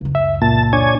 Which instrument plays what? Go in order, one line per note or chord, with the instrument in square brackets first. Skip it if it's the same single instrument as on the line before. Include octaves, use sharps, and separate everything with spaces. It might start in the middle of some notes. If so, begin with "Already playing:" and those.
[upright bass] C#2 F#2
[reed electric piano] E5
[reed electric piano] A#2 [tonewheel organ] A5
[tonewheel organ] D4 C#5 G#5